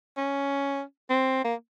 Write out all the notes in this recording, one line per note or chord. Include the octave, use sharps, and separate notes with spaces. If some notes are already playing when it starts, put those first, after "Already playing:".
C#4
C4
A#3